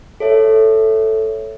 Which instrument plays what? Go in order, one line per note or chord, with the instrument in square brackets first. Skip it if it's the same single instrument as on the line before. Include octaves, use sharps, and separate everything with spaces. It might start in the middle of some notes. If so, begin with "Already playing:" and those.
[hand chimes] A4 C#5 E5